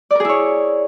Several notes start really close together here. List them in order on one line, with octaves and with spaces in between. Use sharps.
D5 A#4 G#4 E4 C#5